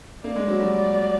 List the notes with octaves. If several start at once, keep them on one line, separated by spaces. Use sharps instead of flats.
A#3 D5
G#3
F#3
G3